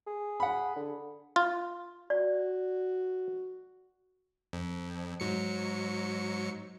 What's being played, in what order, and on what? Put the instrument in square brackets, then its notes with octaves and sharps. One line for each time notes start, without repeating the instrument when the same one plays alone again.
[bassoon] G#4
[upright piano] F#5 B5
[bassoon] D3
[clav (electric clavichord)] F4
[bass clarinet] F#4 [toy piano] D5
[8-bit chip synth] F2
G#2 F#3 C#7